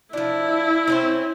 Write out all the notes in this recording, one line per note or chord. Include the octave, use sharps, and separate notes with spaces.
F3 D4 E4
C4 C#4 C5